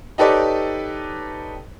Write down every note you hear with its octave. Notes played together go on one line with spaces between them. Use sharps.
D#4 G4 A4 B4 C#5 D5